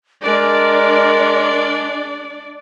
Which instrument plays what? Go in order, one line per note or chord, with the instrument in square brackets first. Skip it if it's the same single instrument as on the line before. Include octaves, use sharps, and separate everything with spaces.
[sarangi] G#3 [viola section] D4 D5 [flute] A#4